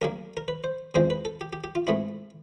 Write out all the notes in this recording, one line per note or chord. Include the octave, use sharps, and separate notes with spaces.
D2 C#3 F#3 A#3 A#4
A#4
B4
C5
E2 C#3 F3 G#3 C4 C5
B4
A4
G4
G4
G4
F4
G#2 E3 A3 C4 E4